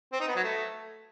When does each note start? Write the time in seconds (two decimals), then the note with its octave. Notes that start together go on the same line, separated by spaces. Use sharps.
0.13 C4
0.20 D#4
0.28 B3
0.36 F#3
0.43 A3